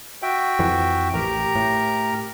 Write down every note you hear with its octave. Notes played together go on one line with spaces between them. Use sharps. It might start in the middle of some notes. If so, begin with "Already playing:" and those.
F#4 E5 G5
F2 E3
A1 G4 A#4 A#5
A2